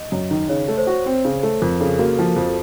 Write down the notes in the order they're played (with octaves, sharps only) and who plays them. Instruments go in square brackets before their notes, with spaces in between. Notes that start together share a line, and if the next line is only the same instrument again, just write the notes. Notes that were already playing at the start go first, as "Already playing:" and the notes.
Already playing: [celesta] D#5
[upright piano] F#2
D#3
[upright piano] C#3 [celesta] C#5
[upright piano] A3
[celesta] C5
[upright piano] F#4
C4
C#3
A3
[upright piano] F2 [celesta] A#4
[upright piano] C#3 [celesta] A4
[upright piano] A#3 [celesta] F#4
[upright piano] F3
F2